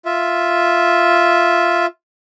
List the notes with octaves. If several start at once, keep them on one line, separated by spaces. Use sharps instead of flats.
F4 E5